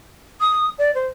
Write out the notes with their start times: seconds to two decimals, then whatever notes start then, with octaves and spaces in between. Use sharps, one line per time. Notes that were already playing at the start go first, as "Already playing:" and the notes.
0.41 D#6
0.79 D5
0.95 C5